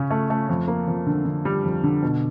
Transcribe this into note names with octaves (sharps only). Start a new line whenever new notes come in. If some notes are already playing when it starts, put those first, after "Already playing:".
Already playing: C#3 C#4
A3
A3
F2
A#3
F2
D3
D3
G3
F2
D3
B2